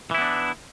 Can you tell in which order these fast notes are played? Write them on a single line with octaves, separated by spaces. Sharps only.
E3 E4 B3 D4